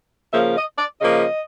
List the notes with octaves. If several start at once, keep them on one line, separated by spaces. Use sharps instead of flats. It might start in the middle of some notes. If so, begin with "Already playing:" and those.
C#3 F3 A#3 E5
D#5
D5
C#3 F3 A#3 D#5